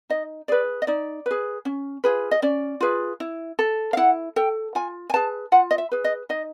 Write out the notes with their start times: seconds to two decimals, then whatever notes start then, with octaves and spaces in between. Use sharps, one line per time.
0.10 D#4 D#5
0.48 G#4 B4 D5
0.82 D#5
0.87 D#4 D5
1.26 G#4 B4
1.65 C#4
2.04 F4 G#4 B4
2.31 D#5
2.42 C#4 D5
2.81 F4 G#4 B4
3.20 E4
3.59 A4
3.93 F5
3.97 E4 F#5
4.36 A4 G5
4.75 F4 G#5
5.10 G#5
5.14 G#4 B4 A5
5.52 F4 F#5
5.71 D#5
5.78 E5
5.92 G#4 B4
6.04 D#5
6.29 D#4 D#5